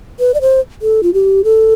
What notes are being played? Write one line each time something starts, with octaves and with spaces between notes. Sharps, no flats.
B4
D5
C5
A4
F4
G4
A4